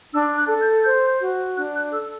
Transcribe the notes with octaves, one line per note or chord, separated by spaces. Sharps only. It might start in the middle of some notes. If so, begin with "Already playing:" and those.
D4 E6
F#6
A4
G6
C5 G6
F#4
D4 F#6
F#6
A4 E6